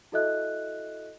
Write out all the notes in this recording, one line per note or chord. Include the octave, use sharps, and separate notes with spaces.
E4 F#4 A4 D#5 E5 F#6